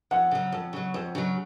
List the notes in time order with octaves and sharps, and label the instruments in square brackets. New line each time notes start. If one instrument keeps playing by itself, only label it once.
[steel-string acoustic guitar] F2 [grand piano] F#5
[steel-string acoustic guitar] C#3 F#3
F2
C#3 F#3
F2
C#3 F#3